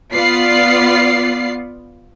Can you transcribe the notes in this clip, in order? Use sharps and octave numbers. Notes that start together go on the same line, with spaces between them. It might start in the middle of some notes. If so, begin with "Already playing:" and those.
B3 F4 D5 C7